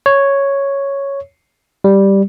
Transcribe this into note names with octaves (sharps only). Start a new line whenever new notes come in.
C#5
G3